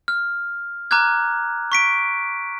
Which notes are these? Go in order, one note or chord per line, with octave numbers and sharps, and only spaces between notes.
F6
A#5 D6 F6 F#6 G#6
C#6 B6 D7